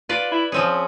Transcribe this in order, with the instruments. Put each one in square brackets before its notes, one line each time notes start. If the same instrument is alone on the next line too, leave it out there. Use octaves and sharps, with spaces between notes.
[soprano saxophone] F4 [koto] B4 D5
[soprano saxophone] E4
[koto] F3 C4 G#4 [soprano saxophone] C#4